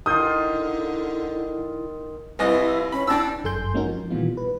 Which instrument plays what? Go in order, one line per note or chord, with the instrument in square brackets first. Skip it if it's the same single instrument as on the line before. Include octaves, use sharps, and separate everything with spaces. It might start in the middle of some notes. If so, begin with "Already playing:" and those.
[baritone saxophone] D3 [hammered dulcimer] D#3 F4 [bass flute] E4 [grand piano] D#6 G6
[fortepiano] C2 D#5 [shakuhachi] E4 [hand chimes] B4
[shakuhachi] C#4 [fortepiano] B5
[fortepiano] D4 E6 [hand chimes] E4 G5 [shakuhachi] A5
[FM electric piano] G1 F#2 A4 G#5 C6 G6
G#3 A#3 C#4 D#4 F#4 A#4
F3
A#2 D#3 E3 G3 B3 F4
B4